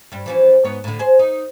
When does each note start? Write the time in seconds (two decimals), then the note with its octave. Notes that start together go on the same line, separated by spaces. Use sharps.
0.12 G2 G3
0.26 E3 F3 C#4
0.64 G#2 B3 C#5
0.84 A2 D3
0.99 G#4 C5
1.19 D#4